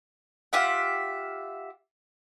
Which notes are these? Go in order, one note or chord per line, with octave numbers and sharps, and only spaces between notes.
F4 G4 E5 F#5